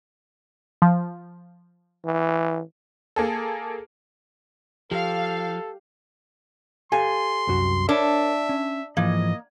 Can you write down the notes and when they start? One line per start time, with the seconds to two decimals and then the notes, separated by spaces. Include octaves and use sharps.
0.82 F3
2.05 E3
3.16 A#3 G#4 A4
4.92 F3 G4 A4 F5
6.92 G4 A4 F5 G#5 C6
7.47 C2 F#2 F#4
7.89 D4 A#4 C#5 E5 B5
8.49 C#4
8.97 G#2 E3 F3 A#3 D#5